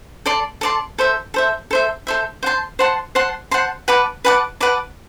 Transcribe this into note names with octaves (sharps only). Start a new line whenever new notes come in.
A4 D5 A5 C6
A4 D5 A5 C6
A4 C5 E5
A4 C5 E5
A4 C5 E5
A4 C5 E5
C5 F#5 A5 C6
C5 F#5 A5 C6
C5 F#5 A5 C6
C5 F#5 A5 C6
B4 F#5 A5 D6
B4 F#5 A5 D6
B4 F#5 A5 D6